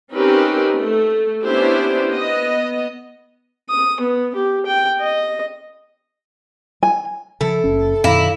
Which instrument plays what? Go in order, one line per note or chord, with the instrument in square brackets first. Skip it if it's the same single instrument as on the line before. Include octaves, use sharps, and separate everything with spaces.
[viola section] C4 C#4 D#4 G4 A#4 B4
A3
B3 C#4 D4 E4 G4 C5
B3 D#5
[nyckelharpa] D#6
B3
G4
G5
D#5
[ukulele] G#5
[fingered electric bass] C#3 F3 [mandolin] E4 [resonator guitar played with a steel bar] A4
[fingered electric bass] F#1 C#4
[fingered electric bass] F#2 B2 D#3 [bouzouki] E4 [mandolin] D5 F5 A#5